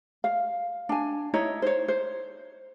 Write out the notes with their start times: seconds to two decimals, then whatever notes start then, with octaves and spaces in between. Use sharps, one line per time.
0.24 F5
0.89 D4 G#5
1.34 D#4 E4 C#5 D#5
1.62 C5 C#5
1.88 C5